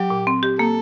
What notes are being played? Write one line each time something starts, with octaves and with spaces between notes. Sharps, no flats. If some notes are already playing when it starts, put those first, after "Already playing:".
Already playing: F#3 G4
A#2
C4
G4
A#3 A4